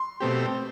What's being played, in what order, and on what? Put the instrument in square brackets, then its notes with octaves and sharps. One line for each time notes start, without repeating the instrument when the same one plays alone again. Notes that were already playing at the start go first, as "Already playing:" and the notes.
Already playing: [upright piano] C6
[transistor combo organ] B2 A3 C4 G4